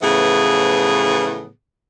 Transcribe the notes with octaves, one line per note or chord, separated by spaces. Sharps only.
A2 C#3 E3 F3 B3 G#4